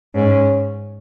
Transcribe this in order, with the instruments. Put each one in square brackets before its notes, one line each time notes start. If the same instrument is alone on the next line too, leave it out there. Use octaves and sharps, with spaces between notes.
[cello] G#2 [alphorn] C#4